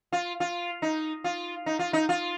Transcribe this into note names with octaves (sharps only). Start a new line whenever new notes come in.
F4
F4
D#4
F4
D#4
F4
D#4
F4